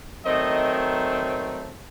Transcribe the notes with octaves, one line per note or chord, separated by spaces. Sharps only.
D#3 F#3 A3 C4 D#5